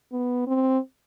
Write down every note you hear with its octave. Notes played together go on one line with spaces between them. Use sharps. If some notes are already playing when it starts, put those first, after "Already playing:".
B3
C4